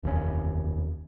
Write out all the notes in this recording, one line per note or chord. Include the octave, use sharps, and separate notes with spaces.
F1 D#2 G#2 C#4